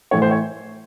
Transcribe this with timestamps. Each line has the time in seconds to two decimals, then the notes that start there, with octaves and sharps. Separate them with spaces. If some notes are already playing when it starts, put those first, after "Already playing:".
0.11 A2 E3 A3 C#5
0.22 C5
0.31 C#5